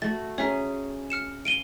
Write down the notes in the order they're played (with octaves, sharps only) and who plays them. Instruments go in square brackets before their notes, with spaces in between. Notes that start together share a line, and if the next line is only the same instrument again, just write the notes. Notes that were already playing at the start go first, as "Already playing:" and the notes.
[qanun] A3 F#4 [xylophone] A6
[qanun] C#4 G#4 [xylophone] C#5 E5 A#5
[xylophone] F6 C#7 E7
[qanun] F5 [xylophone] D7 D#7 G7